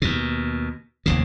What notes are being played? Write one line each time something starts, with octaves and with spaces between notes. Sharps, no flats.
D#2 B2
F1 D#2 C#3